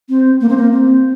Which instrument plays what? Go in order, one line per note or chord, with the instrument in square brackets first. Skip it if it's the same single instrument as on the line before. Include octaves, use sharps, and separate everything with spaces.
[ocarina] C4
A#3
C4
A#3
C4